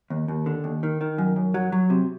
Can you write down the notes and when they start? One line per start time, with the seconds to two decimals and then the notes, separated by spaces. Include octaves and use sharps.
0.10 D#2
0.28 D#2
0.46 D3
0.64 D#2
0.83 D#3
1.01 D#3
1.18 F#2
1.36 F#2
1.54 F#3
1.72 F#3
1.90 C3